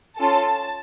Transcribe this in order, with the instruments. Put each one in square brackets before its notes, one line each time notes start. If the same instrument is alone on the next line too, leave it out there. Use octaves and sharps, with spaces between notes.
[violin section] C#4 F4 A4 A5